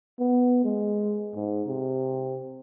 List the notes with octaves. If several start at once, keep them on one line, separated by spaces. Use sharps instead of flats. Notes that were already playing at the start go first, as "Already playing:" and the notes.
B3
G#3
G#2
C3